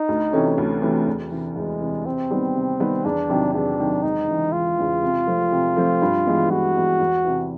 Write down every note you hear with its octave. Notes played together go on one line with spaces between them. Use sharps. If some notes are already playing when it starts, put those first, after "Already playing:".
Already playing: D#4
D2
C3 E3 A3 C#4
D2
C3 E3 A3 C#4
E2
C3 E3
E2 G#3
C3 E3
C3 C4
D#3 G3 B3
C3
D#3 G3 B3
E2 D4
C3 D#3 F#3
E2 D4
C3 D#3 F#3
E1 D#4
E2 C#3 E3
E1 F4
E2 C#3 E3
C3
F3 A3 C4
C3
F3 A3 C4
G2
E3 G#3 B3
G2 F#4
E3 G#3 B3
E2
C3 E3